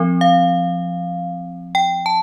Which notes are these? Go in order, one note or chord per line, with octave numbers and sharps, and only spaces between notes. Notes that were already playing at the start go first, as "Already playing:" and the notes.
Already playing: F3 C4
F5
G5
A5